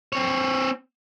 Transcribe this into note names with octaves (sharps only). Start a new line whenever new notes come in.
C4 C#5